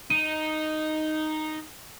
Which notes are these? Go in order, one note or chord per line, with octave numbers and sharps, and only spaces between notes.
D#4 D#7